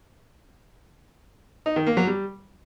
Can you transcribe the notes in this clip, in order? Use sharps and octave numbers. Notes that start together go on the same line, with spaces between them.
D#4
D#3
A#3
F#3
G3